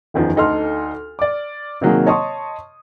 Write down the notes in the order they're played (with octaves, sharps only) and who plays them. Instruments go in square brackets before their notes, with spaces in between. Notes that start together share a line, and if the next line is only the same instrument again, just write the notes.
[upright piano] F#1 E2 D#3 F3
D2 D#4 A4 C6 F6
D5 D6
C3 D#3 F#3 A#3 G#4
C#5 D#5 A5 C6 C#6 D#6